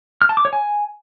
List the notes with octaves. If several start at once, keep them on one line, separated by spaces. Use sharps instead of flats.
F6
A5
D6
C#5
G#5